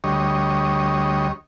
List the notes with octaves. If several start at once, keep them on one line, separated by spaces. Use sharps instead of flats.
D2 G3 C#5 D#5